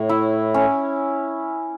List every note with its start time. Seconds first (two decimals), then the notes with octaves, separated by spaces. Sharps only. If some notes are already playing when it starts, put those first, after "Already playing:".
Already playing: A2 C#5
0.09 E4
0.54 C#4